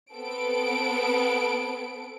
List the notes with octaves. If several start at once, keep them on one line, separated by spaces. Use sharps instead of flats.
B3 C4 A4 D7